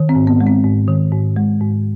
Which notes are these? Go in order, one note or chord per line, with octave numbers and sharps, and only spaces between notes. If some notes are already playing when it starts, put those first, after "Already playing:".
Already playing: D#3
C4
G#2
B3
G#3
C4
G#2
D#3
G#2
G#3
G#2